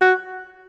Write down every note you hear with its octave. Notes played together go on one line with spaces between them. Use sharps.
F#4